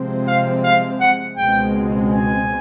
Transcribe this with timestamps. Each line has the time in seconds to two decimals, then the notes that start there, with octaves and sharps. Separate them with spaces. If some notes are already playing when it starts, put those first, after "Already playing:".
Already playing: C3 F3 G#3 C4
0.27 F5
0.64 F5
1.01 F#5
1.37 C#2 B2 G#3 C4 G5
2.10 G#5